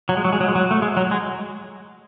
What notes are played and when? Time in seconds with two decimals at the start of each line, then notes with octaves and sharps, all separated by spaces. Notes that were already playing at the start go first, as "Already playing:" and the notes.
0.09 F#3
0.17 G#3
0.25 F#3
0.33 G#3
0.40 F#3
0.48 G#3
0.55 F#3
0.71 A3
0.82 G#3
0.97 F#3
1.11 G#3